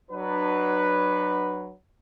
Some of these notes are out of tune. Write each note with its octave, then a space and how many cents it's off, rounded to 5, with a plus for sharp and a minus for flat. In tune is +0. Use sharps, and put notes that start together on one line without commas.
F#3 +10 D4 +40 B4 +0